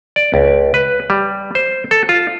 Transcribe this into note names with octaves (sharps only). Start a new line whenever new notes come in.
D5
C#2
B4
G3
C5
A4
F4